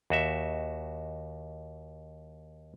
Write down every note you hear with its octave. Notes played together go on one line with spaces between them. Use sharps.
D#2 F#4 E5